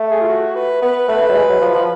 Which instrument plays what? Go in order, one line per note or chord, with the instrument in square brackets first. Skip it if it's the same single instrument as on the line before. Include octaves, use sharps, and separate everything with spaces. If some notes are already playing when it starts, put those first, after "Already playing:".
Already playing: [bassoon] A3
[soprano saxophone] G#4
F4
F#4
B4
[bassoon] B3 [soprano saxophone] B4
[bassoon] A3 [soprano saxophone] B4
[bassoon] A3
F#3
G#3
F#3
F3
F3